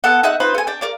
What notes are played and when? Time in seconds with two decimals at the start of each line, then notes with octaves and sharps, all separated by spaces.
0.04 B3 A4 F#5
0.23 D#4 E5 F#5 F#6
0.40 D#4 F4 B4 C5
0.55 A3 G#5
0.67 D4 G5
0.81 A#4 D5 F5